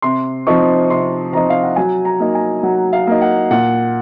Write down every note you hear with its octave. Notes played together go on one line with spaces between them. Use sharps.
C3 C6
F3 C4 D#4 C#6
C3 C6
F3 C4 D#4 A#5
F5
F#5
F#3 G#5
A#5
A#3 D#4
G#5
F#3 F#5
F5
A#3 D#4
F#5
A#2 F#5